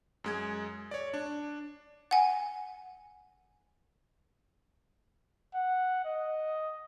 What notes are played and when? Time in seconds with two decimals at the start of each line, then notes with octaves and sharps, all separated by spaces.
0.24 F#2 G#3 G#6
0.91 C#5 D5
1.14 D4
2.11 F#5 G#5
5.54 F#5
6.04 D#5